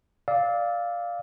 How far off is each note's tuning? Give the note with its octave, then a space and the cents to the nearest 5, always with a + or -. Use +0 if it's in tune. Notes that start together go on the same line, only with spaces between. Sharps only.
D5 +0 F5 +0 E6 -35